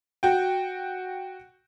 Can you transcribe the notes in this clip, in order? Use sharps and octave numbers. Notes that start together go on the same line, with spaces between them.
F#4 G5